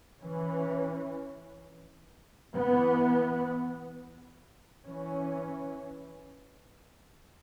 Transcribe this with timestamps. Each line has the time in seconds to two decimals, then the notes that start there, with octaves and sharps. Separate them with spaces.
0.22 E3 C#4
2.55 E3 B3
4.86 E3 C#4